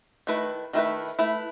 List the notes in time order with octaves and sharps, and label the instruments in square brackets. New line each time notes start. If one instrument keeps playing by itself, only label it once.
[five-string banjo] D#3 A3 E4 B4
D#3 A3 E4 B4
A3 E4 B4